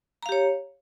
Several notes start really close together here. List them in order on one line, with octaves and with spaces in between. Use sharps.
A#5 F5 G4 C#5